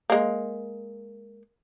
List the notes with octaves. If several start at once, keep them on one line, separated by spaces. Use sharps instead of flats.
G#3 A#3